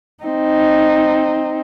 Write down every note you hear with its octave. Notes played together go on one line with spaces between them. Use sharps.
C4 D#4